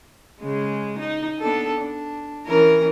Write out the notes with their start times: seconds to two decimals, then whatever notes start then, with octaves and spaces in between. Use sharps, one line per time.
0.41 C#3 G#3
0.98 D#4
1.40 B3 D4 A4
1.79 D4
2.47 E3 C#4 A#4